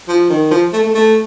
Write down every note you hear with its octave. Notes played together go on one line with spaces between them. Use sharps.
F3
D#3
F3
A3
A3
A3